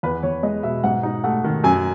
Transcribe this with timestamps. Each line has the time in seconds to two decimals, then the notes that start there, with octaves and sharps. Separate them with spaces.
0.03 E2 B4
0.23 E2 C#5
0.43 G#3 D#5
0.63 B2 E5
0.84 G#2 F#5
1.03 D#4
1.24 A3 F#5
1.44 D#3
1.64 F#2 G#5